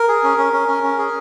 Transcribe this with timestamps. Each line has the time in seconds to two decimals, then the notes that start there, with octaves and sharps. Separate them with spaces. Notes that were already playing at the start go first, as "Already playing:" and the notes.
Already playing: A#4
0.08 G#4
0.24 C#4
0.38 C#4
0.53 C#4
0.68 C#4
0.83 C#4
0.98 G#4